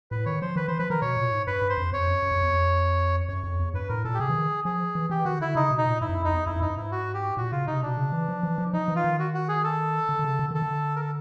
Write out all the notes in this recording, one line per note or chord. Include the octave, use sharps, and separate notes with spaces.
A2 B4
D#3 C#5
F3 C5
D#3 B4
E3 C5
F3 B4
D#3 A#4
B2 C#5
A#2
G#2
G2 B4
G2
C5
F2
F2 C#5
F#2
F#2
F2
E2
F2
F#2 C#5
F2
E2
G2 B4
A2 A#4
A#2 A4
G4
C3 G#4
E3
D#3
F3 G#4
E3
E3 G4
D#3 F#4
D3 E4
C#3 D#4
B2
D#4
A#2
G#2 E4
F#2
F2
D#4
E2
F2 E4
F#2
G2 D#4
G#2 E4
F#4
G4
A#2 F#4
C#3 F4
C3 D#4
B2 D4
C#3
E3
F3
E3
F3
F3 D#4
E3
F4
D#3
F#4
F#4
G#4
A4
D3
D3
C#3
D3
D#3 A4
D3
A#4
A4